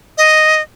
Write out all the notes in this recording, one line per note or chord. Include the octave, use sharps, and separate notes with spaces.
D#5